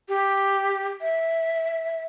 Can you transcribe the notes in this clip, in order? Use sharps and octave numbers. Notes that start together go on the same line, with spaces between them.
G4
E5